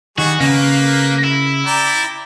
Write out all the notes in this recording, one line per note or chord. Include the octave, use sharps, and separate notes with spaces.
D#3 G3 F#4 G#4 C#6
C#3 A#3 B4
E4
D5 G5 A#5